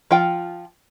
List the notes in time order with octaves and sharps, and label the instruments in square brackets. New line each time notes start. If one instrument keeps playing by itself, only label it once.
[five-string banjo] F3 F4 G5